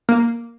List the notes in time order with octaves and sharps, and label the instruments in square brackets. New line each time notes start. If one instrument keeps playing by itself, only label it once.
[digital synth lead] A#3